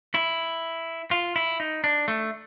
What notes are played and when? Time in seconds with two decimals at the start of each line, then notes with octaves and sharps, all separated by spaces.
0.14 E4
1.11 F4
1.36 E4
1.60 D#4
1.84 D4
2.08 A3